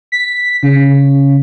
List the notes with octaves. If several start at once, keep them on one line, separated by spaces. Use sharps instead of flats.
B6
C#3